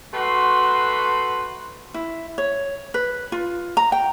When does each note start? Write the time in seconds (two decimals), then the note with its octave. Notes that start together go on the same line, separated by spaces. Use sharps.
0.14 A3 F#4 B4 C6
1.94 E4
2.38 C#5
2.94 B4
3.32 F4
3.77 A#5
3.92 G5